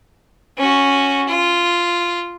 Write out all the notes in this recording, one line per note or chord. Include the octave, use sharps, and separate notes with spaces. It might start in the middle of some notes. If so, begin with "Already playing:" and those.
C#4 F#4
F4